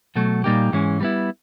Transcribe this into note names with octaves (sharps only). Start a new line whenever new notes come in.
B2 F#3 A3
A#2 G3 A#3 D#4 G4
G#2 E3 G#3 C#4
G3 B3 E4